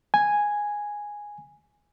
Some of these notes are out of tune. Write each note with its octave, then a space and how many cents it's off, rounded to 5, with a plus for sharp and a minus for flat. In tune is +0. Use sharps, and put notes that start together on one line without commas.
G#5 -5